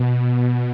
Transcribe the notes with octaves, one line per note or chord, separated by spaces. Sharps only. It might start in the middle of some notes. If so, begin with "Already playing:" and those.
Already playing: B2